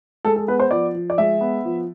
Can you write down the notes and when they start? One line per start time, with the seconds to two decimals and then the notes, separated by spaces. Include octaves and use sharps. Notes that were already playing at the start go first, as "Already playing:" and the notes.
0.25 G#3 A4
0.36 A4
0.48 B3 B4
0.60 C5
0.71 F3 D5
0.95 F3
1.10 D5
1.18 G#3 E5
1.41 B3
1.65 F3